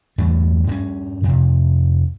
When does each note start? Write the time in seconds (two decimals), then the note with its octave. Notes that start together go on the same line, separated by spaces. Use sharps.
0.18 E2 G2 A3
0.67 G2 C4 C#4
1.24 F2 C3